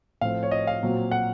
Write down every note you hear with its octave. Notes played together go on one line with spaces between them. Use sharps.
A2 F3 C4 F5
C#5
D#5
F5
A#2 F#3 C4
F#5